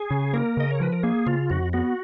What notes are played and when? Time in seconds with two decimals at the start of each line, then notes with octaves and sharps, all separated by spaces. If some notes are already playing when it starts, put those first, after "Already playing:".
Already playing: G#4
0.11 C#3
0.33 A#3 A#4
0.57 C#3 D#5
0.71 C#5
0.80 F3 B4
0.92 A#4
1.03 A#3 G#4
1.26 C#3 F4
1.50 F2 F#4
1.73 B3 F#4